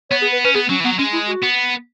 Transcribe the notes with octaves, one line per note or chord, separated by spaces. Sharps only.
B3 C#5
G#4
B4
C#4 B4
B3 G#4
F#3 C#4
E3
F#3 B3
G#3 C#4
E4
F#4
B3